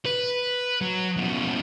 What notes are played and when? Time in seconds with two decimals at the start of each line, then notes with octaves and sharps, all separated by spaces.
0.05 B4
0.82 F#3
1.17 D#2 B2